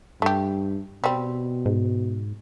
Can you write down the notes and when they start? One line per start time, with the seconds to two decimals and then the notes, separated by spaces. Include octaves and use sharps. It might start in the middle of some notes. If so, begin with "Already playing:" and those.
0.22 G2 A3 G4
1.04 B2 G3 C4
1.65 G#2